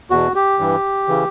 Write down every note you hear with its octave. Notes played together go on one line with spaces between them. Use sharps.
E2 B2 F#4
G4
G2 E3
C#3 E3